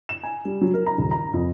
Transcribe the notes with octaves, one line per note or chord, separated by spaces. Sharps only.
E7
G#5
G3
F#3
A#4
A#5
D#1
A#5
F2